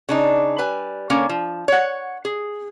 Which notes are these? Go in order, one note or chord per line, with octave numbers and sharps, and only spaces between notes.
C#3 D4 D#4
G3 B4 G#5
D3 A#3 C#4 C#5
F3
C#5 F#5
G#4